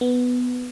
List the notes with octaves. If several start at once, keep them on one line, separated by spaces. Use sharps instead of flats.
B3